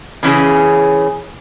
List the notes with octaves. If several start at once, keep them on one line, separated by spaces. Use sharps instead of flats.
C#3 E3 C#4 G#4